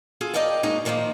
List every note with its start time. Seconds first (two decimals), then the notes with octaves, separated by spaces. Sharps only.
0.21 F4 G#4 A4
0.34 A#4 D5 D#5 F5 G5 A5
0.63 C#3 G#3 A#3 D#4 G#4
0.85 A#2 D#3 F3 A3 A#3